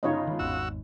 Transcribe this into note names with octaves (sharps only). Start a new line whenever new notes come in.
G1 C#3 D#4 F4 C#5 D#5
D#3 G#3
G#1 E2 G#3 F#4 E6